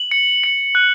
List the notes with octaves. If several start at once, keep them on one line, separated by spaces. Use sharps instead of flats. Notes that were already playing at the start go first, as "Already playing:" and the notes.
Already playing: F#7
C#7
C#7
F#6